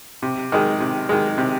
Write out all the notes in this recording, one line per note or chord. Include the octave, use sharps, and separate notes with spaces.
C3
D#3 G#3
C3
D#3 G#3
C3